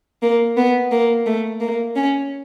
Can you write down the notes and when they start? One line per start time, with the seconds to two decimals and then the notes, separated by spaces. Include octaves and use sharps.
0.22 A#3
0.57 B3
0.92 A#3
1.26 A3
1.61 A#3
1.96 C#4